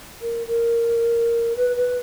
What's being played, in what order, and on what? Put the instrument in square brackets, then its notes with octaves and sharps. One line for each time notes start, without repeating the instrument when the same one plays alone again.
[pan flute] A#4
A#4
B4
B4